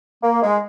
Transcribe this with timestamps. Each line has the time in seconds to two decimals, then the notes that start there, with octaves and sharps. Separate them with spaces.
0.22 A#3
0.42 G#3